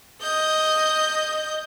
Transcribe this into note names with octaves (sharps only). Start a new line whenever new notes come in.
D#5 G6